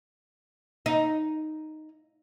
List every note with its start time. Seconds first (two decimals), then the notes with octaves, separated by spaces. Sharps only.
0.86 D#4